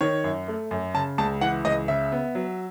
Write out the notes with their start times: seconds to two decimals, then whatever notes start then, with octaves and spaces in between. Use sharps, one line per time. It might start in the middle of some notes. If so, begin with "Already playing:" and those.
0.01 D#3 C#5
0.24 F#2
0.48 A3
0.71 F#2
0.94 C#3 A5
1.18 C#2 A5
1.41 E3 F#5
1.65 C#2 D#5
1.88 C#3 E5
2.12 B3
2.35 F#3